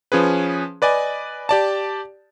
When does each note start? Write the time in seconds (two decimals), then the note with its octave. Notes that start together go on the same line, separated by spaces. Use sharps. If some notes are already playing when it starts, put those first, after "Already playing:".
0.12 F3 C#4 G#4 B4
0.82 B4 D5 D#5 G#5
1.49 G4 D5 A5